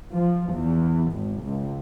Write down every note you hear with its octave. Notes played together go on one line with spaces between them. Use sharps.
F3
E2
G#1
C#2